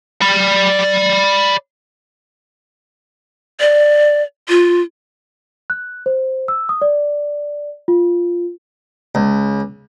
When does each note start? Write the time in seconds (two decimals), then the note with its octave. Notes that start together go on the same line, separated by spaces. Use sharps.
0.21 D5 B5
3.60 D5
4.49 F4
5.70 F#6
6.06 C5
6.48 E6
6.69 D#6
6.82 D5
7.88 F4
9.15 C#2